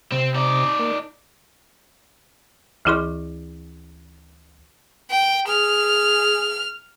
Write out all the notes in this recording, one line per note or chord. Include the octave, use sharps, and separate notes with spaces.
C3 C4
D#4 D5
A#3
D2 E3 E4 G#4 C6 C#6
G5
G#4 F6